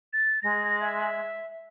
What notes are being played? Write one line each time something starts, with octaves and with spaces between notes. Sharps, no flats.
A6
G#3 A#6
E5